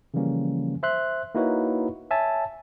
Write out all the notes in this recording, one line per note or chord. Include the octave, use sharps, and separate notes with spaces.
C#3 E3 F3 G3 A#3 C#4
C5 E5 C6 F#6
A#3 D#4 E4 F#4 B4 C#5
C#5 E5 G#5 A5